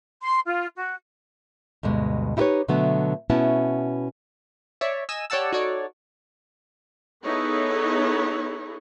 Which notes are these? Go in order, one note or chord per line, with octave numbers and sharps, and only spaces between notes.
C6
F4
F#4
D2 G2 B2 G#3
D#4 E4 G4 G#4 B4 C#5
B2 D3 F#3 A3 B3
B2 B3 C#4 E4 F#4 A5
C#5 D5 E5
D#5 G#5 E6 E7
G4 C#5 D5 F#5 A5 E6
D#4 F#4 A4 C#5 D5
B3 D#4 E4 G#4 A4 C#5